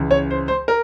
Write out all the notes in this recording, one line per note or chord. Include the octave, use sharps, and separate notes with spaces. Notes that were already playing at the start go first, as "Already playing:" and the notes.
Already playing: C#2 C#3 E3
C#5
C5
C5
A#4